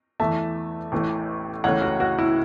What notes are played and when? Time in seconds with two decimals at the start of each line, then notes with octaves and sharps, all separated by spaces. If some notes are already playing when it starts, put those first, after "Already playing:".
0.20 E2 E3 A3 E5 A5
0.92 A1 A2 E3 A3
1.64 C#2 C#3 E3 A3 C#5 F#5
1.82 F#4
2.00 F#4
2.19 E4